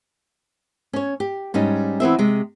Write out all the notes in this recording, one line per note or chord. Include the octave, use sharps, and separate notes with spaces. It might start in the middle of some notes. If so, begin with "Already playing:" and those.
C#4 C#5
G4
G#2 G3 C#4 D#4
E3 B3 C4 E5
C3 G#3